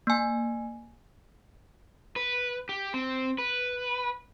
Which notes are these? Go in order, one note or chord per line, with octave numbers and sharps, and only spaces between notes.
A#3 G#5
B4
G4
C4
B4